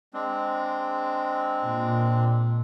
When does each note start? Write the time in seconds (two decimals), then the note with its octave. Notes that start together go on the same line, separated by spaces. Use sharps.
0.14 G#3 C4 D4
1.62 A#2